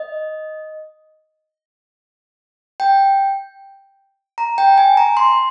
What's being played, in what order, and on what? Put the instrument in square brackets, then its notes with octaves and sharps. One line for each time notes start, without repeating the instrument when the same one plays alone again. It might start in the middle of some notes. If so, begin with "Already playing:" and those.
Already playing: [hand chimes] D#5
G5
A#5
G5
G#5
A#5
C6